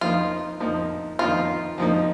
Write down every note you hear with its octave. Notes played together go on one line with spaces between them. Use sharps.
F2 F3 A#3 D#4 F4
F2 F3 A#3 D#4
F2 F3 A#3 D#4 F4
F2 F3 A#3 D#4